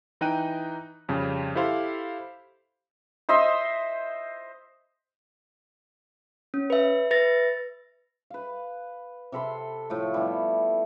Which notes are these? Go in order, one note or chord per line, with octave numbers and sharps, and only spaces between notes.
E3 D#4 D#5 G5 F#6 D#7
F2 C#3 G3
E4 G4 A4 C5 F5 C6
C5 D#5 E5 C6
C#4
B4 E5
B4 E5 A6 A#6
B4 F5
C3 A4 B5 C6
A2 F3 A3
G3 B3 E4